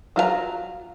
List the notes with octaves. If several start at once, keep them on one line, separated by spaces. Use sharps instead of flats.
F#3 F4 A#4 A#5